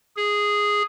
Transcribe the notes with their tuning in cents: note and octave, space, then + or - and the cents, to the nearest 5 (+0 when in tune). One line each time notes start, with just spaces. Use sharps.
G#4 -5